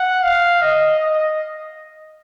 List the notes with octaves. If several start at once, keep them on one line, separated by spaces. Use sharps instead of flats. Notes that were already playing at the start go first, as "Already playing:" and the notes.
Already playing: F#5
F5
D#5
D#5